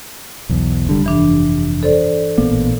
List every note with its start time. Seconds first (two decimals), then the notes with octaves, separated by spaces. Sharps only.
0.49 B1 E2
0.87 F1 D3 G3
1.04 F1 G2 E3 D4
1.83 A4 C5 D5
2.38 A1 A#2 A#3 B3